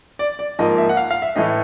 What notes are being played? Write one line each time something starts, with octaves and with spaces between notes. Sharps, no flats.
D5
D5
G#2 F3 A#3 D#5
E5
F#5
F5
F5
E5
A2 E3 A3 D#5